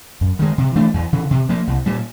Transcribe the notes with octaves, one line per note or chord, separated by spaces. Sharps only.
F#2
D#3 G#3
C3
E3 A3 D4
E2
C#3 E3
C3
F3 A#3
C2
A#2 G3